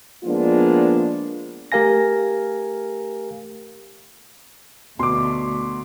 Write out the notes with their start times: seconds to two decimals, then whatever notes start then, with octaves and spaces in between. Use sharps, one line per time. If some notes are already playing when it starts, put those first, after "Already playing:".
0.24 F3 G#3 A#3 B3 D4 F4
1.72 A3 G4 A#4 F5 G#5 A#6
4.99 D2 B2 C6 D6